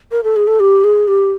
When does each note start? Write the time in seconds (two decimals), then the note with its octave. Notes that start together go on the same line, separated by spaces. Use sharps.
0.12 A#4
0.24 A4
0.36 G#4
0.47 A4
0.60 G4
0.84 G#4
1.08 G4